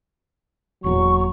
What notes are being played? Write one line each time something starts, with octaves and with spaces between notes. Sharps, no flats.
E1 E2 A#2 F#3 C#6